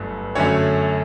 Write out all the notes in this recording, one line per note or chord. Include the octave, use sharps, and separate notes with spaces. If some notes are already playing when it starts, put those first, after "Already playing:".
Already playing: G1 G2 F#3 A3
F#2 D3 A3 C#4 C#5